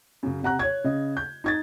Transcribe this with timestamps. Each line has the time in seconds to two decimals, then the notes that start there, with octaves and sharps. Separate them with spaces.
0.23 F#2 C#3
0.43 C3 F#5 A#5 F#6
0.59 C#5 G#6
0.84 C#3 D#5
1.17 G6
1.44 D#4 G#6 A6